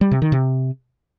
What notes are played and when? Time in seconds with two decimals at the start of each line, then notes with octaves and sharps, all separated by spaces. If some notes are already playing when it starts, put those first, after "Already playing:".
0.01 G3
0.11 C3
0.22 D#3
0.32 C3